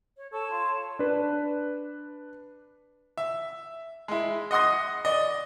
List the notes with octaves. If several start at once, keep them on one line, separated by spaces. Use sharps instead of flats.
C#5
A4 C#5 A5 C#6
F4
D4 B4
E5
G#3 E4
D#5 F#5 C6 D#6 A#6
D5 D#5